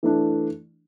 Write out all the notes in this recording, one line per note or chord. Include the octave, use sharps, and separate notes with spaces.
E3 A3 D4